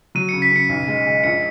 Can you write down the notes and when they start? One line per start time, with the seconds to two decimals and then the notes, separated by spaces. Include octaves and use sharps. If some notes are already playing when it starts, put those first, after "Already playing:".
0.15 F#3 D#7
0.29 C#3 C#7
0.42 B6
0.52 C#3 C#7
0.69 B1
0.88 G#3
1.06 G#3
1.24 A#1 C#7